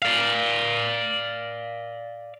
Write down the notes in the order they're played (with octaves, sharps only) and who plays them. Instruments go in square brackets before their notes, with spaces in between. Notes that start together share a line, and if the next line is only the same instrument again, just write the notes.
[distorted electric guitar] D5 F5